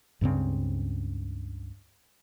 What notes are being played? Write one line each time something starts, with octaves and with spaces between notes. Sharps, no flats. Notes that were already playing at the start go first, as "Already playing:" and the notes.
C#2 G2 C#3 C4